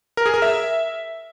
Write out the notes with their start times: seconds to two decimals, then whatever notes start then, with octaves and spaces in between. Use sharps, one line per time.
0.17 A#4
0.26 G#4
0.34 A#4
0.42 E5